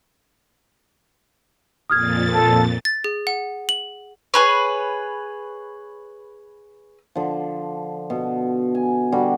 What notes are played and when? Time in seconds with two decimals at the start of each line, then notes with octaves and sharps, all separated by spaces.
1.90 F2 A#2 D#6 F6 G#6 A6
2.34 A4
2.85 A6
3.04 G#4
3.27 F#5
3.69 F#7
4.34 G#4 B4 C#5
7.15 D3 F3
8.10 B2
8.75 G#5
9.12 D3 G3 F#4